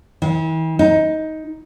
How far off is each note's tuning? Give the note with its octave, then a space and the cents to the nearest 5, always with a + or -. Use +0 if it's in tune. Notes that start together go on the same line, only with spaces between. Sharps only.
E3 -40
D#4 +15